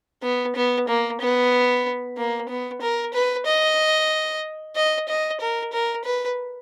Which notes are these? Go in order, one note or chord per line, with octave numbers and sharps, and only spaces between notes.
B3
B3
A#3
B3
A#3
B3
A#4
B4
D#5
D#5
D#5
A#4
A#4
B4